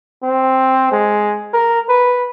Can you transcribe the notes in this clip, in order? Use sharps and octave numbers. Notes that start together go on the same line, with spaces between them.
C4
G#3
A#4
B4